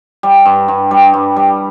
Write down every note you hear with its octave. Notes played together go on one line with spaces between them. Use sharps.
G3
G2
G2
G3
G2
G3